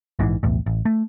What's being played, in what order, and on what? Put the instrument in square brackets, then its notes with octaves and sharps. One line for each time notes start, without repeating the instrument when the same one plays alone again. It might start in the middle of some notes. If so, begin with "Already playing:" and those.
[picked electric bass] A#1 G#2 C3 E3
B1 E2 A2
A1
A3